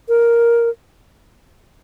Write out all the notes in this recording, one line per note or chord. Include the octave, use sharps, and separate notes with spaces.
A#4